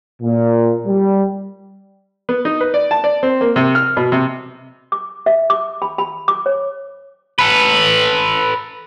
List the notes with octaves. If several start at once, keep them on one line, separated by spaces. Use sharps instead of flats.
A#2
G3
B3
D#4
B4
D5
A5
D5
C4
A#3
C3
F6
B2
C3
D6
E5
D6
B5
B5
D6
C#5
A4 B4